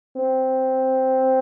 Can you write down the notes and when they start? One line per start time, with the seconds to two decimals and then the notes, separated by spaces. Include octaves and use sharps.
0.16 C4